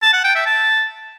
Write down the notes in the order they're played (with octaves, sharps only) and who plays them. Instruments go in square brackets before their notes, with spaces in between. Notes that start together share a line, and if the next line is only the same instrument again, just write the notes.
[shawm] A5
F#5
G5
E5
A5